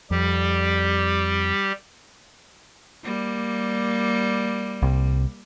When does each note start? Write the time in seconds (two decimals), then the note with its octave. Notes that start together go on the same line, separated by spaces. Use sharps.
0.11 F2 G3 G4
3.04 G3 A#3
4.82 C2